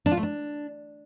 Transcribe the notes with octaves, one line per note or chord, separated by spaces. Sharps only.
D4
F4
A3
D4